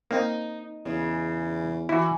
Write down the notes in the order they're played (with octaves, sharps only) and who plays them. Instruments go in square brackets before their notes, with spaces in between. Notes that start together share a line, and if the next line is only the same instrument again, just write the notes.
[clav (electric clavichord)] A#3 C4 [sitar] D#4
[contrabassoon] E2 [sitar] C#3
[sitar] E3 [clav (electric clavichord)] E4 F#4